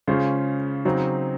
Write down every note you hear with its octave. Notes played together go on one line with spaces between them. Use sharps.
C#3 G#3 C#4 F4 C5
C#3 F#3 C4 D#4